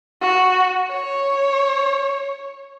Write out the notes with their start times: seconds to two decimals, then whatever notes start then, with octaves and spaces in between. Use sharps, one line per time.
0.21 F#4
0.88 C#5